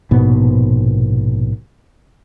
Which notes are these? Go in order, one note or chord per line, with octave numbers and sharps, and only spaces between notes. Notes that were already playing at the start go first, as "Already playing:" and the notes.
A#1 G#2 B2 B3